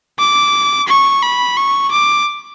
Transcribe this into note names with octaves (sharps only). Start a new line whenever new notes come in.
D6
C#6
B5
C#6
D6